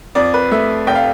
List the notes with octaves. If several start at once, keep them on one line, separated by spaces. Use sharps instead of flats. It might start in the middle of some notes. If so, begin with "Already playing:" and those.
F2 D5
B4
A3 E5
F1 G5
F5